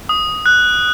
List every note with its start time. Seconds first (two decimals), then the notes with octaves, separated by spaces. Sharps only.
0.09 D#6
0.46 F#6